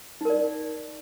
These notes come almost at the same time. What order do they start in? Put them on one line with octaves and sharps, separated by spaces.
D#4 A#4 D5